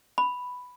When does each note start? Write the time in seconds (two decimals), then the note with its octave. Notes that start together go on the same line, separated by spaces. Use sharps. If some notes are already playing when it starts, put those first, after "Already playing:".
0.18 B5